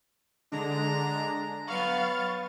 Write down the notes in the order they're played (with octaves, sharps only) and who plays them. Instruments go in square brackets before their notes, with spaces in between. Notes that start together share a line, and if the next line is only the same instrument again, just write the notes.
[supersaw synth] D3 G#3 D4 [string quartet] A#5
[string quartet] F#3 B3 [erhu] F5 [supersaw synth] C#6 A6